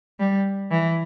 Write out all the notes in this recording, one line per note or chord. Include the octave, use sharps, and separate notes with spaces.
G3
E3